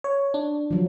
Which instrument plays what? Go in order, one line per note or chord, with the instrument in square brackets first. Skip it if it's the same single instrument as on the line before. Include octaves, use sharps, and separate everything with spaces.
[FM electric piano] C#5
D4
[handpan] F3 F#3